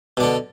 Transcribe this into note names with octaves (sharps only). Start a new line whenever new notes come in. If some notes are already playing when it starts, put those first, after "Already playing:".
B2 D3 D4